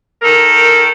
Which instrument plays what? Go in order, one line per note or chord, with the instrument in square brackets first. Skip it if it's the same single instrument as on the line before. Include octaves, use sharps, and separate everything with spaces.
[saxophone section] D#3 A4 A#4